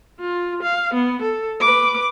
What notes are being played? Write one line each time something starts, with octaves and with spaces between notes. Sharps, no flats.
F4
F5
B3
A4
B4 D6